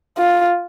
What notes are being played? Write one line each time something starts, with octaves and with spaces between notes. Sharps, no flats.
F4